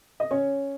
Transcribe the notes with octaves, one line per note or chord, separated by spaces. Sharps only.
D#5
C#4 C#5